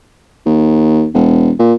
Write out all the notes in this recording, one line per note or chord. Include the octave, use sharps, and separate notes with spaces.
D#2
E1
A#2